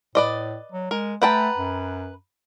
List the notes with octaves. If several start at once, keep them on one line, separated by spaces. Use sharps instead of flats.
A2 B4 D5 D#5
F#3
G#3 A#4
A3 B4 F#5 G5 A5 A#5
F#2